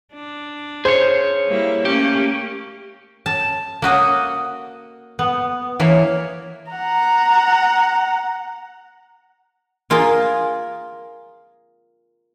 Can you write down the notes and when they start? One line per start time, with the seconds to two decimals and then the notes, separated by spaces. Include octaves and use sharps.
0.13 D4
0.85 G#4 C5 C#5
1.47 G3 A#3 E4
1.85 A3 A#3 C#4 G4
3.26 A5
3.82 A#3 F#4 D#5 F#5
5.19 B3
5.79 E3 A#3 C#5
6.71 F#5 A#5
9.90 A#3 F4 G#4 A#4